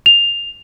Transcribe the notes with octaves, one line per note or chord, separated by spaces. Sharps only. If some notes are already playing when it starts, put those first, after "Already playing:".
F7